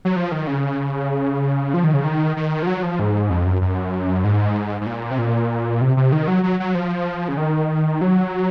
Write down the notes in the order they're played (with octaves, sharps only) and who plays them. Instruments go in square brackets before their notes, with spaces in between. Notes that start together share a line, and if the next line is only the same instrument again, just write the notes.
[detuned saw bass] F#3
F3
D#3
C#3
F3
D#3
C#3
D#3
D#3
F3
F#3
F3
G#2
F2
F#2
F#2
G#2
G#2
A#2
C3
A#2
C3
C3
D#3
F#3
F#3
F#3
F3
C#3
D#3
F#3